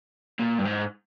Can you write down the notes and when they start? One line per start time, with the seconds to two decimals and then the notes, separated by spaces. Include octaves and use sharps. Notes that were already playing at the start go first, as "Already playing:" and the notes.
0.39 A#2
0.59 G2
0.65 G#2